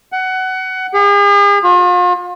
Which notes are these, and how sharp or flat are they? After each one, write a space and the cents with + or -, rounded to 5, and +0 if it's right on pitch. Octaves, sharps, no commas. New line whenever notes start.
F#5 +20
G#4 -45
F4 +40